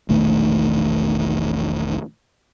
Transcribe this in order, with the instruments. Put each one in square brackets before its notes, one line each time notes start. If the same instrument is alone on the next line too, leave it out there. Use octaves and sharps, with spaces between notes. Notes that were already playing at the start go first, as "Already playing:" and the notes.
[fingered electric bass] E1 A#1 D#3 A3